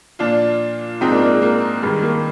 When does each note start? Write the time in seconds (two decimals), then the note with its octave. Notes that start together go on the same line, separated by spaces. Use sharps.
0.19 A#2 F3 D4 F4
1.01 G#2 F3 C4 D#4
1.11 A#3 D4
1.22 A#3
1.32 G#3
1.42 A#3
1.82 G2 D#3 G#3
2.03 A#3